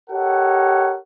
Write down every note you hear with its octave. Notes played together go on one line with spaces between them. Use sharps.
G4 A4 A#4 C#5 D#5 F#5